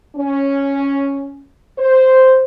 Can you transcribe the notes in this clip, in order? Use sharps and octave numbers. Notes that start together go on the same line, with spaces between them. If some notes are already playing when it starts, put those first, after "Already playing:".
C#4
C5